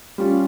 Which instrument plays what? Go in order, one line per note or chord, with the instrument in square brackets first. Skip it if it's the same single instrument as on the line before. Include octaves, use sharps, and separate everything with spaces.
[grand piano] G3 C#4 F4